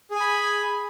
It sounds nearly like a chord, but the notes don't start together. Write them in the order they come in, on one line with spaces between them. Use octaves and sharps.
G#4 G#5 B5